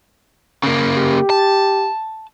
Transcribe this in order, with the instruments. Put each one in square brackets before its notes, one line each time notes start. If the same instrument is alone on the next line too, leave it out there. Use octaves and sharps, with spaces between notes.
[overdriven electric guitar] C#3 A#3
[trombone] G4
[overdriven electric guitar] A5